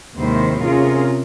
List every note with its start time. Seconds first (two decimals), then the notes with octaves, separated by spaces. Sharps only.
0.16 D#2 G#2 C3 D#3 E4 C5
0.62 C3 C#4 F4 G#4 A#4